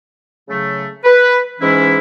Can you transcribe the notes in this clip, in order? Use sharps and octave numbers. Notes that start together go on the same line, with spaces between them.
C#3 F#3 A3
B4
G#2 E3 G#3 C#4 E4